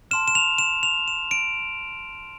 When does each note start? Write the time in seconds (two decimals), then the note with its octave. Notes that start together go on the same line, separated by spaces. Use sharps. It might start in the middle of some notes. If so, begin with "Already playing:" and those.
0.11 A5 C6 F6 E7
0.28 E7
0.35 F7
0.58 E7
0.83 F7
1.08 E7
1.31 D7